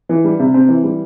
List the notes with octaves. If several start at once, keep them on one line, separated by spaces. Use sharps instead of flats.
E3
G3
C3
C4
E3
G3